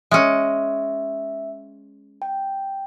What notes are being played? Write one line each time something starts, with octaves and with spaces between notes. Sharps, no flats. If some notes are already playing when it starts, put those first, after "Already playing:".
G#3 C#4 E5
G5